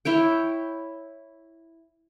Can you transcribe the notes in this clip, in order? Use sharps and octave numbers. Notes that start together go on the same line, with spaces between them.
E4 C#5 G5